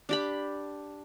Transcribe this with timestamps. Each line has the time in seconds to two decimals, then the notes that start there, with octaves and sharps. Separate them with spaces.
0.09 D4 G4 B5